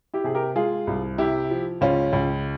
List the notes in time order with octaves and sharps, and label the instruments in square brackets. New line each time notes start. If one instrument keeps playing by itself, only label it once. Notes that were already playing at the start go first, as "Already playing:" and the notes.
[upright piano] E4 G4
C3 G#4
G4 A#4
G#3 F4 G#4
C2
C3 E4 G4
F3
C#2 C#4 F4
C#2